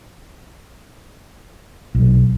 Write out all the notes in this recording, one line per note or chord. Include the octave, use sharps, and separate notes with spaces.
B1